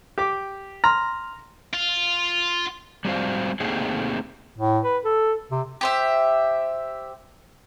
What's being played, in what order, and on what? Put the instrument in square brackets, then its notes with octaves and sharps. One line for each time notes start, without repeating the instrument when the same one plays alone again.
[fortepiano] G4 D6
[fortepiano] A#5 [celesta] C6 F6
[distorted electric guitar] F4
[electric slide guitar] G3 G#3 C4 F#4 C5 F5
A3 A#3 C4 D#4 G4 G#4
[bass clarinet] A2
B4
A4
C3
[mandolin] G4 C5 E5